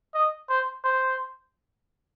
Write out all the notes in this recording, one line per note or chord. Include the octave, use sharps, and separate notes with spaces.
D#5
C5
C5